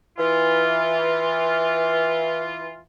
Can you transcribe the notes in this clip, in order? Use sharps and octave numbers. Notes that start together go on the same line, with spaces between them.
E3 F4